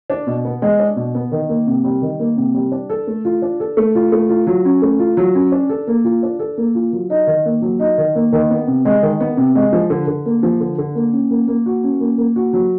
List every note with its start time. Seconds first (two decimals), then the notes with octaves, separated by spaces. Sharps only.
0.10 D4
0.27 B2
0.45 B3
0.62 G#3
0.79 D4
0.96 B2
1.15 B3
1.32 D#3
1.49 A#3
1.67 C3
1.84 G3
2.02 D#3
2.20 A#3
2.37 C3
2.54 G3
2.72 D4
2.90 A4
3.07 A3
3.25 F4
3.42 D4
3.60 A4
3.77 A3
3.95 F4
4.12 A3
4.29 F4
4.47 F#3
4.65 C#4
4.82 A3
4.99 F4
5.17 F#3
5.35 C#4
5.52 D4
5.69 A4
5.87 A#3
6.04 F4
6.23 D4
6.39 A4
6.58 A#3
6.75 F4
6.93 F#3
7.10 D#4
7.27 D#3
7.45 A#3
7.62 F#3
7.79 D#4
7.98 D#3
8.15 A#3
8.32 D#3
8.50 B3
8.67 C3
8.85 G#3
9.03 D#3
9.20 B3
9.37 C3
9.55 G#3
9.73 F3
9.90 D3
10.07 D3
10.26 A#3
10.43 F3
10.60 D3
10.78 D3
10.95 A#3
11.13 C#4
11.31 A#3
11.48 A#3
11.66 F#4
11.84 C#4
12.01 A#3
12.18 A#3
12.36 F#4
12.53 F#3